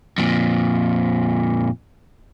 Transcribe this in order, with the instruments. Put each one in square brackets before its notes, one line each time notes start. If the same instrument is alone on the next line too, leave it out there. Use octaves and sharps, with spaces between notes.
[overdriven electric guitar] F2 A#2